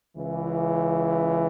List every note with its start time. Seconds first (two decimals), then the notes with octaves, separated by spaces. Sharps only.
0.15 C#2 C#3 E3